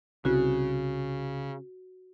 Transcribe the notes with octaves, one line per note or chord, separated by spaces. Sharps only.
C2 C#3 F#4